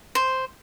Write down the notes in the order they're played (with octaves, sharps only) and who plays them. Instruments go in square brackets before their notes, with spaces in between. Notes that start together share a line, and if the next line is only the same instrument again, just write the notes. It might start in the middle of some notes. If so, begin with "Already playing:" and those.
[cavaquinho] C5